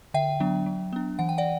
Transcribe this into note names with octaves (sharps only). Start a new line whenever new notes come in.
D3 E5 G5
F#3 B3 D4
F#3
B3 D4
E3 F#5
G5
D5 F#5